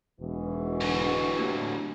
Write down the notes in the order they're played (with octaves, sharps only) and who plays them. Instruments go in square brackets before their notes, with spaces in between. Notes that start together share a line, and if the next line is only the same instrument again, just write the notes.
[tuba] E1 [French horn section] G#2 B2 E3
[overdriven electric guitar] D3 F#3
[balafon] A3 A#3 G4